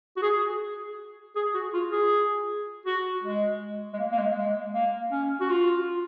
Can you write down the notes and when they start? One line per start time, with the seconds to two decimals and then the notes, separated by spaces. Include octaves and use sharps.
0.17 F#4
0.22 G#4
1.36 G#4
1.54 F#4
1.74 F4
1.92 G#4
2.86 F#4
3.24 G#3
3.94 G#3
3.99 A#3
4.12 A#3
4.18 G#3
4.37 G#3
4.74 A#3
5.12 C#4
5.41 F#4
5.50 F4